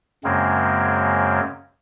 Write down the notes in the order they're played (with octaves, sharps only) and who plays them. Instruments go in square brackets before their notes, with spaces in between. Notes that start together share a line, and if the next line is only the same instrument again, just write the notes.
[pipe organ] F#2 C#3 G#3 A#3 C4